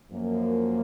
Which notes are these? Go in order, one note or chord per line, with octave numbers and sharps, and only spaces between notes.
F#2 F3 A#3